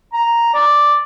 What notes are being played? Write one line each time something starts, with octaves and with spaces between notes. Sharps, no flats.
A#5
D5